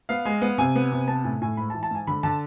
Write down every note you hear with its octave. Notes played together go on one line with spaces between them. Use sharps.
B3 F5
G#3
B3
C3 G#5
B3
C3
B3 A5
A2 G#5
A2 G#5
G#2 B5
A5
E3
A5
G#2 G#5
D3 B5
D3 A5